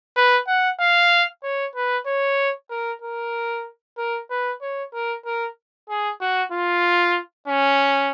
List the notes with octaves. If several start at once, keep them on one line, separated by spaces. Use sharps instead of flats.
B4
F#5
F5
C#5
B4
C#5
A#4
A#4
A#4
B4
C#5
A#4
A#4
G#4
F#4
F4
C#4